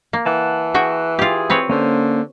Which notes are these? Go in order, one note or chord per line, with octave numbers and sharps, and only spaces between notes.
A#3
E3 F#5 A5
F#4 G#4 G5
F4 G4 G#4
C4 B4 C#5
D3 A#3 C#4 C5